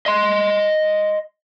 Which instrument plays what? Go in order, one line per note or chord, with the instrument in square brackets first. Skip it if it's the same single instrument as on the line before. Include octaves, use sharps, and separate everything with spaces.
[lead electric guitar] D#5 C6